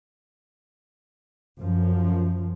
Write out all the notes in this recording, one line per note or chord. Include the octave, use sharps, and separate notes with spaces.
F#2 F3